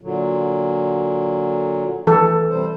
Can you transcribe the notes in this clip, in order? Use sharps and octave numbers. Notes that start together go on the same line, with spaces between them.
A#2 D3 F#3
E3 A4
C3 G3 C5